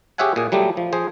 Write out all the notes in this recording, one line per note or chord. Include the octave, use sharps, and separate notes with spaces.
G4 G#4 C#5 E5 F#5 G#5
A#2 G#4
F#3 G3 A3 G4
F3
F3 G#4 C5